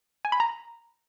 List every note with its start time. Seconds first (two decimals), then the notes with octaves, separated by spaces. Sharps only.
0.25 G#5
0.32 B5
0.40 A#5